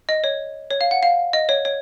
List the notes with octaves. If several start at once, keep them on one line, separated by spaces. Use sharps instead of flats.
D#5
C#5
C#5
F5
F#5
F5
D#5
C#5
C#5